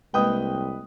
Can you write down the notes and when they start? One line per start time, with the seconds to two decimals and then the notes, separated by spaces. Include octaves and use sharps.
0.14 C2 G#3 A#3 B4 D#5 G5 D#6